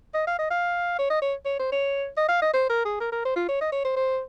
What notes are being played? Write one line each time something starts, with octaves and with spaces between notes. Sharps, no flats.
D#5
F5
D#5
F5
C#5
D#5
C#5
C#5
C5
C#5
D#5
F5
D#5
C5
A#4
G#4
A#4
A#4
C5
F4
C#5
D#5
C#5
C5
C5